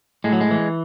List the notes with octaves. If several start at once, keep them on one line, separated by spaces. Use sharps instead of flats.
A2 G#3
F#3
G#3
E3